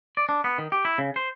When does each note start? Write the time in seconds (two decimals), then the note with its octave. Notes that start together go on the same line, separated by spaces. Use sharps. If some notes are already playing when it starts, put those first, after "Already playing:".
0.17 D5
0.29 D4
0.44 B3
0.58 D#3
0.72 G4
0.85 E4
0.98 C#3
1.16 C5